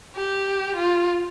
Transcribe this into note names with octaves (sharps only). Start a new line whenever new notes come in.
G4
F4